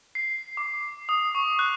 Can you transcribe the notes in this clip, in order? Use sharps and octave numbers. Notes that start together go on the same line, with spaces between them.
C7
D6
D#6
C#6
F#6